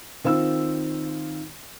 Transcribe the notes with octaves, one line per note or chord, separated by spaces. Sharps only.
D#3 C4 F4 E6